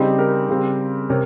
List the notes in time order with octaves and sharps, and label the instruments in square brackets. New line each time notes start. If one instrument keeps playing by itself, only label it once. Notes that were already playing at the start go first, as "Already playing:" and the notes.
Already playing: [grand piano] C#3 G3 C4 D#4 G4
G4 A#4
C#3 G3 C4
C3 A#4 C#5